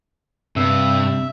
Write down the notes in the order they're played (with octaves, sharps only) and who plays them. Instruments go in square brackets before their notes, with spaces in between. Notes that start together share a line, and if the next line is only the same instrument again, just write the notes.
[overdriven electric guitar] G2 [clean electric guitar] C3 [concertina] E5